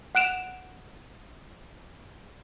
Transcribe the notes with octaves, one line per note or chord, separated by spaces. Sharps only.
F#5 F#6 D7 E7 F7